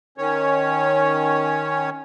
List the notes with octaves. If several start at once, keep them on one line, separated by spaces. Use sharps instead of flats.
D#3 C#4 C#5